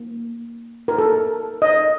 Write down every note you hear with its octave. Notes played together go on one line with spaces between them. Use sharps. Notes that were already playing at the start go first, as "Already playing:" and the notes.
Already playing: A#3
A#4
A4
D#5